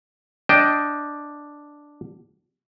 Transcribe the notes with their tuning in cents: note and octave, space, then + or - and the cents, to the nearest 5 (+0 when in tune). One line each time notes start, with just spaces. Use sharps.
D4 +0 D#5 +10 G5 +0